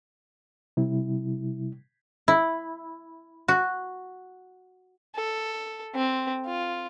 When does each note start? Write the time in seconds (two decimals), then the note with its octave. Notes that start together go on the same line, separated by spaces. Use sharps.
0.77 C3 G3 E4
2.28 E4
3.48 F#4
5.16 A4
5.95 C4
6.46 F4